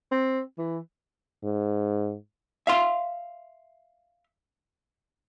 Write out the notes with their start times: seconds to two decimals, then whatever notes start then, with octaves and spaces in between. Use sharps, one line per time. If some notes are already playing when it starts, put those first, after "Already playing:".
0.12 C4
0.58 E3
1.44 G#2
2.67 E5 F5 C6